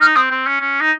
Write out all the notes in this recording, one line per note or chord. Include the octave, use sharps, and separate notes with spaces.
D#4 F6
C4 D#6
C4
C#4
C#4
D#4